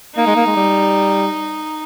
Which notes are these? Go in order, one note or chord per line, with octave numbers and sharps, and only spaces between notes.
A#3 D#4
G#3
A#3
G#3
G3